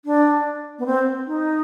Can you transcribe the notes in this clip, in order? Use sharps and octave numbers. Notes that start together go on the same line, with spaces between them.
D4
B3
C4
D#4